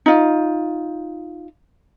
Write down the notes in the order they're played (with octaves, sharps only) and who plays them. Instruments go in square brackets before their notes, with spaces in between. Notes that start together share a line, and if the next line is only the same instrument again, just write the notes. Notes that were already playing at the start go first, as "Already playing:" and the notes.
[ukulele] D#4 F4